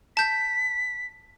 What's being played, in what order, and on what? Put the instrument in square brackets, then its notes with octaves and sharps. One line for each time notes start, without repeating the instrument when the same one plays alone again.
[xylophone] A5 G6 [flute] B6